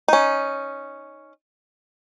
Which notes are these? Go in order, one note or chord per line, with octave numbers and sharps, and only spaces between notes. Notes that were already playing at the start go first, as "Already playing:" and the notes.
C#4 D#4